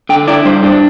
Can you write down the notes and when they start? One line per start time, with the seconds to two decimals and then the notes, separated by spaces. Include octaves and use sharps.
0.09 D3 G5
0.27 E4 D5
0.45 G2 C5
0.63 D4